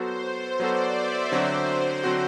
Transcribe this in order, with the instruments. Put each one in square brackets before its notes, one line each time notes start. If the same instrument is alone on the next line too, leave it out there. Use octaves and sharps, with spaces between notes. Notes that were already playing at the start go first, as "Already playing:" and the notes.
Already playing: [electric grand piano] F#3 B3 F#4 A4 [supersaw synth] C5
[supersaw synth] C5
[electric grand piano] F#3 B3 F#4 A4 [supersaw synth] D5
[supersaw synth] E5
[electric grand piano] D3 F#3 C4 F#4 [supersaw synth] C5
[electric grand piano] D3 F#3 C4 F#4